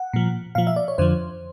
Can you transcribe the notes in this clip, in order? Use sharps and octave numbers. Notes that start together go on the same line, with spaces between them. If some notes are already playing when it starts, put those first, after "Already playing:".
Already playing: F#5
A#2 F3
A#2 F3 F5
E5
D5
C#5
F2 D3 F3 C5